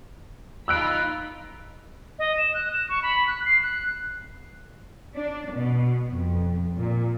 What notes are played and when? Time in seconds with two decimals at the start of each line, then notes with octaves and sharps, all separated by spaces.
0.68 D#4 F4 B5 E6 F#6 D7
2.19 D#5
2.38 E7
2.54 F#6
2.74 E7
2.89 C#6
3.03 B5
3.27 F#6
3.45 C7
3.62 F#6
5.15 D4
5.54 B2
6.09 F2
6.77 A#2